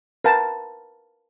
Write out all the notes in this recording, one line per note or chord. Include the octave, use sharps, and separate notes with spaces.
A#4 B4 F5 G5 A5